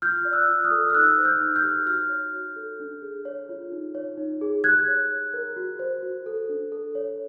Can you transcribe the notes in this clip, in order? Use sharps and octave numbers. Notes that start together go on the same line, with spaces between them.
F4 F6 G6
D5
E6 F#6
F4
D#6 F6
A4
F6
D#4 E6 F#6
C5
F6 G6
D#4
F6 G6
G4
F#4 F6 G6
C#5
F#4
A4
D4
G#4
C#5
F4
D#4
C#5
D#4
G#4
G4 F#6 G#6
C#5
G4
A#4
F#4
C5
F#4
A4
D4
A4
C#5